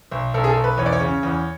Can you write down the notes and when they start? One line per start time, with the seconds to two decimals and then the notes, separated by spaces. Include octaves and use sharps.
0.11 B1
0.34 B1 A4
0.44 G#4
0.49 A4
0.57 B1
0.64 B4
0.78 E2 C#5
0.86 D5
0.92 C#5
1.01 C#3
1.23 E2